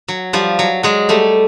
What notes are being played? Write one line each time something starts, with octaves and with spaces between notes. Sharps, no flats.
F#3
F3 G3
F#3
F#3 G#3
G3 A3